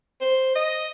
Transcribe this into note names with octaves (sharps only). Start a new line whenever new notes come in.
C5
D#5